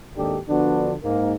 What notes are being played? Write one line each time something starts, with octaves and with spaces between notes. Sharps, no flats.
G#1 D#2 D4 D#4 G4 A4
D3 F3 B3 D4 F#4
G#2 A#3